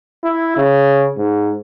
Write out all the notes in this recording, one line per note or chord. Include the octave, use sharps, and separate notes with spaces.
E4
C#3
G#2